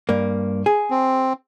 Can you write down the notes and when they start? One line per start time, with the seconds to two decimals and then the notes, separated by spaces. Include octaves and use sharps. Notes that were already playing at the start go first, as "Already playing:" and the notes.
0.09 G2 A#3
0.66 G#4
0.90 C4